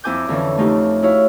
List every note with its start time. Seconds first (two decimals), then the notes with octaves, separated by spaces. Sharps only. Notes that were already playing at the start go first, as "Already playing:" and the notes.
0.04 F2 C4 E4 G#5 D6 G6
0.29 F2 D3 E3 C#4
0.58 A3 C#4 D#4 F4 G4
1.02 E4 F#4 C#5 F5